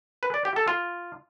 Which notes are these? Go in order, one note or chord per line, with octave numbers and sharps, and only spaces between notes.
B4
D5
G4
A4
F4